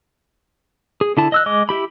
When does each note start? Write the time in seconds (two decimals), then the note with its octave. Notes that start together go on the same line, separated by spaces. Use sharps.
1.01 G#4
1.17 D3 E4 A5
1.32 D#5 E6 F#6
1.46 G#3 D#5 D6
1.69 E4 G4 B5